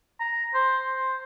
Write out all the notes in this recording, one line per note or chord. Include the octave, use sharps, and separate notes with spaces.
A#5
C5
C5